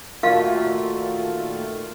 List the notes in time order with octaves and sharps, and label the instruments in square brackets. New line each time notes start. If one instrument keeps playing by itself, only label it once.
[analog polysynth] A#2 D#3 A3 [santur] F4 [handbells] F#4 A#4 [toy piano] F5